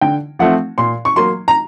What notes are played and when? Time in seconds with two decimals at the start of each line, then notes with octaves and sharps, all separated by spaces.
0.01 D3 G5
0.39 F3 A3 C4 F#5
0.78 A#2 C6
1.05 C#6
1.16 F#3 A#3 C6
1.48 A#5